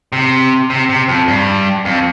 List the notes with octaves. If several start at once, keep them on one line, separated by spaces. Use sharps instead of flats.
C3
C3
C3
F2
G2
F2